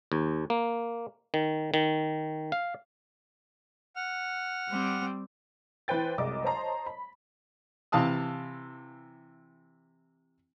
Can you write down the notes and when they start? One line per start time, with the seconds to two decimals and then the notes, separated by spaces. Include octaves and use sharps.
0.12 D#2
0.50 A#3
1.34 D#3
1.74 D#3
2.52 F5
3.96 F#5 F6
4.69 G3 C4
5.88 E3 B4 C5 G5 A6
6.18 C2 F#2 G#3 D#5 D6
6.44 C5 C#5 D#5 A5 A#5 C6
6.86 B5
7.92 C3 E3 F5 A5 D#6